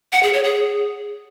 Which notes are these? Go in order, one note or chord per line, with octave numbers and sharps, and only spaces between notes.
F#5
G#4
C#5
G#4